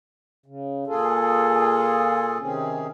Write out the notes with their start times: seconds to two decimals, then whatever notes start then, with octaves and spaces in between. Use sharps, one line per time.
0.46 C#3
0.87 A#2 F4 G#4 A4
2.40 C3 D#3 C4 C#4 G#4